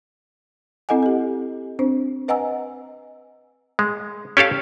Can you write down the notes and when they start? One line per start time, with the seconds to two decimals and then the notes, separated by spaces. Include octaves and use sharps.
0.89 C4 E4 A4 D#5 F#5 G#5
1.03 G4 A4
1.79 C4 D4 C5
2.28 B4 D#5 F#5 G#5 A#5 E6
3.79 G#3
4.37 C#4 G4 A4 F5